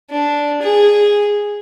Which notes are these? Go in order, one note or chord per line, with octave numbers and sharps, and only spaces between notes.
D4
G#4